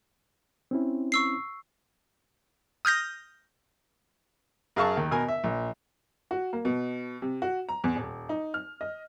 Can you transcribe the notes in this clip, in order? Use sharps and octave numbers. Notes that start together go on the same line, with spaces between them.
C4 C#4 E4
C#6 E6 C7
D#6 F6 G6 A#6
F#2 G#4 F5 A5 C#6
D#2
B2 A#4 G#5
E5
A#1
F#4
A#3
B2
C3
F#4
A#5
E2
D#1
D#4
F6
D#5